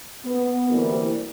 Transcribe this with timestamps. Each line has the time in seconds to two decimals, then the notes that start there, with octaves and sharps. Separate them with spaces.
0.25 B3
0.69 D2 C3 E3 G3 A#3